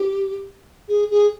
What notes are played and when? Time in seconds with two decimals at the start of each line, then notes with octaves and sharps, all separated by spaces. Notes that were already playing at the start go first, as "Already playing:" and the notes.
Already playing: G4
0.89 G#4
1.11 G#4